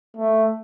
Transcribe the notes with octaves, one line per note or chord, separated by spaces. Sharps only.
A3